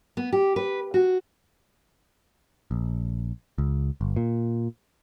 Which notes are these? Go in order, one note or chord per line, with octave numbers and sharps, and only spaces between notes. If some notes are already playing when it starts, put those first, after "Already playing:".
B3
G4
B4
F#4
A#1
C#2
G1
A#2